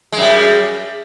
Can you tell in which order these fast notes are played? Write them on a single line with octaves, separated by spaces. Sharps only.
G#3 F#2 G3